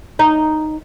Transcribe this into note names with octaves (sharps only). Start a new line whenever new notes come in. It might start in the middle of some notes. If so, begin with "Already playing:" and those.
D#4